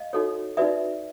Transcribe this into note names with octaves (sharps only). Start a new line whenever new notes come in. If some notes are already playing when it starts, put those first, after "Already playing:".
Already playing: D#5 F5
D#4 F#4 A4 C#5
D#4 F#4 B4 D5 E5